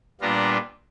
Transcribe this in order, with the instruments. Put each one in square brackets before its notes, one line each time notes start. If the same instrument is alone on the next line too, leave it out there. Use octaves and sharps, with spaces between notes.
[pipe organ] A#2 G3 B3 D4 F4 A#5